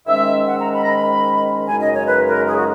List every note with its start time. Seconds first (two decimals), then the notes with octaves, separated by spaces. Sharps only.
0.06 G#2 D#3 G#3 C#4 E5
0.46 F#5
0.60 A#5
0.74 B5
0.83 A#5
0.87 B5
1.67 F#2 C#3 G#3 D#4 G#5
1.81 D#5
1.94 C#5
2.07 B4
2.27 A#4
2.47 G#4
2.57 F#4